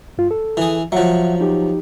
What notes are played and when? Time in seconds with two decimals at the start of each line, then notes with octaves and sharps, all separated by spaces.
0.18 G2 F4
0.31 A4
0.57 E3 G#4
0.92 F3 F#3 E5 F#5
1.40 D#4 G4